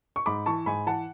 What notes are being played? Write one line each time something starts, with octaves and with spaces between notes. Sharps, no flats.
C#6
G#2 B5 D6
E3 A5 C#6
G#2 G#5 B5
E3 F#5 A5